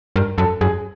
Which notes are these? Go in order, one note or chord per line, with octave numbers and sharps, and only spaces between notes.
G2 A#4
F#2 A4
F#2 G#4